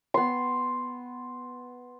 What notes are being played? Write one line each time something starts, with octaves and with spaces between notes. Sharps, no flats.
B3 C6